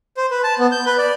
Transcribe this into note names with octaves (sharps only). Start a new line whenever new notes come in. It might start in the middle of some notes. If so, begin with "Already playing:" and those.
C5
B4
A5
B3
G6
B4
D5